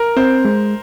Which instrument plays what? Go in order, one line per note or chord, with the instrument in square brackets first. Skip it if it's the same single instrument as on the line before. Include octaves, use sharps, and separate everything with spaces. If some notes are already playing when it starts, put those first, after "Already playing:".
Already playing: [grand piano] A#4
[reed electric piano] C4 [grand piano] C5
[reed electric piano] G#3